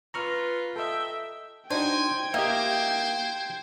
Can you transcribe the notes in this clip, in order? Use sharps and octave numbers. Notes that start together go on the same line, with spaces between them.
F4 B4 A#5 C#6 F6
A4 D#5 E5 G5
D4 D#4 F#4 C5 G5 G#5 G#6
A#3 G4 C5 D#5 E5